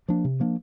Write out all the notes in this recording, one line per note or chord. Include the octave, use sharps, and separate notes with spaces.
F3 A#3 D4
C3
F3 A#3 D4